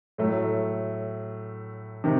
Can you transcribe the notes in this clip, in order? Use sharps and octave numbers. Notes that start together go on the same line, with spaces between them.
A2 F#3 A3
C3 D#3